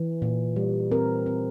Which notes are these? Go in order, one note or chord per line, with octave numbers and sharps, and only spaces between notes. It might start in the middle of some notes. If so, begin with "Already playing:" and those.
Already playing: E3
A#2
G3
C4 A#4
C4